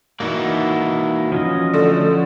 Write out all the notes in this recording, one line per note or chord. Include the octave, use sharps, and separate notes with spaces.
E3 A#3 D#4 E4 F#4 D5
F3 C#4 D#5
D3 A3